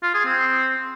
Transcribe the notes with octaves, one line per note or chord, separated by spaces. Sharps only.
F4
G#4
C4